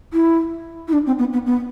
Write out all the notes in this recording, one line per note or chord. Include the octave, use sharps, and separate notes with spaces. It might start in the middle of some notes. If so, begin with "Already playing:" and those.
E4
E4
D4
C4
B3
B3
B3